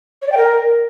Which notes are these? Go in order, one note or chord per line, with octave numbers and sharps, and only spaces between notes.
C#5
D5
G5
A#4